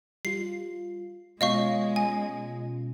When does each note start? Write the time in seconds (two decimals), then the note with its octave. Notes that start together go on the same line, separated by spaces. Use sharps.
0.25 G3 F4 C7
1.41 B2 G#3 C#4 F4 D#5 F5 C#6
1.96 G#5